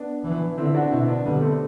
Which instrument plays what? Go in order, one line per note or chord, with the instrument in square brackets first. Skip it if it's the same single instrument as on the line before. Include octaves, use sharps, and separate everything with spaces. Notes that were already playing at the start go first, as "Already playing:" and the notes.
Already playing: [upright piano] B3 D4
[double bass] E3
[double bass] D3 [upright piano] C4 E4
[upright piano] D4 F#4
[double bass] B2 [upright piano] C4 E4
[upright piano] B3 D4
[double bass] D3 [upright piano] G3 B3
[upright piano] A3 C4